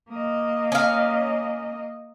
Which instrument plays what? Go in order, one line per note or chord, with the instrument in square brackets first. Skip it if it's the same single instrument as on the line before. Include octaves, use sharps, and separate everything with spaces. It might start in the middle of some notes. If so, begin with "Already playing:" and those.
[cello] A#3 D#5
[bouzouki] C#4 F5